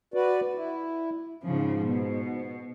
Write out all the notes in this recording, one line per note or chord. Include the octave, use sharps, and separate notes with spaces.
F#4 B4 D5
E4
G#2 C#3 F3
B2